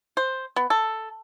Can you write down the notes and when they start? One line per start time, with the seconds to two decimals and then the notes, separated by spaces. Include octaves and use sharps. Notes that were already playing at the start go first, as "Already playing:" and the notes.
0.17 C5
0.56 B3
0.70 A4